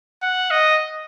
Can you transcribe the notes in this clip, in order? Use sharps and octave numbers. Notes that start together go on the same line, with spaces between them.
F#5
D#5